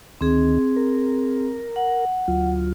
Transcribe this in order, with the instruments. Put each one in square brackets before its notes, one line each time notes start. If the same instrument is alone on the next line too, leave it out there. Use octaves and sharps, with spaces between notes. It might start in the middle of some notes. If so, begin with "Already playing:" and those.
[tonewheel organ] D2 D#3 [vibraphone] C4 G#4
[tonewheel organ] A#4
[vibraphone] F#5
[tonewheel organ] D2 F#3 F4